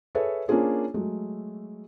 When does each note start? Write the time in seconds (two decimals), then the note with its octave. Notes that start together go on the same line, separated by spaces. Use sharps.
0.15 G#4 A4 B4 C#5 E5
0.48 A#3 C#4 D4 F4 G#4 C5
0.94 F#3 G#3 A3